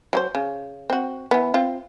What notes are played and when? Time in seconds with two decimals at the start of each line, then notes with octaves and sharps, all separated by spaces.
0.13 F#3 G4 C5
0.35 C#3
0.90 C4 F#4
1.31 E3 B3
1.54 C4 F4 F5